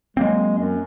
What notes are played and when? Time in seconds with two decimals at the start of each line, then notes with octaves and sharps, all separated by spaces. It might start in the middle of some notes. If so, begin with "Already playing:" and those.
0.17 F#3 G#3 A#3 C4
0.59 F#2